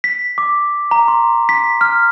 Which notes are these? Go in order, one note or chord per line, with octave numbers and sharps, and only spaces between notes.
B6
D6
A#5
C6
B6
F6